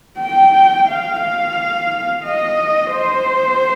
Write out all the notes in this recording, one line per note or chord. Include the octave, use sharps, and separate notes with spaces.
G5
F5
F5
D#5
C5